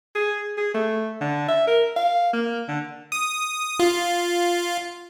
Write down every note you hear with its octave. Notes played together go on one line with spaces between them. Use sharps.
G#4
G#4
A3
D3
E5
A#4
F5
A#3
D3
D#6
F4